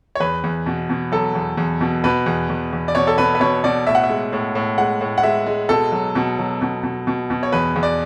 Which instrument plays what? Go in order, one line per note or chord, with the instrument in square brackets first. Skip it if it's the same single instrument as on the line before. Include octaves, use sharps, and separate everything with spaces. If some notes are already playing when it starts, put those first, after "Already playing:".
[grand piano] C#5
E2 B4
E2
B2
B2
F#3 A4
E2
E2
B2
B2 B4
E2
E2
E2
D5
B2 C#5
A4
B2 B4
B4
B2 C#5
B2 D5
A2 E5
F#5
E5
G#3
A2
A2
G#3 F#5
A2
F#5
G#3 E5
G#3
B2 A4
F#3
B2
F#3
B2
B2
B2
B2
C#5
E2 B4
E2
D5